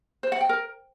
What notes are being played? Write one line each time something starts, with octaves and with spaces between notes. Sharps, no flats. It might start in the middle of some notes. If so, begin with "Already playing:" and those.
C5
F#5
G5
A#4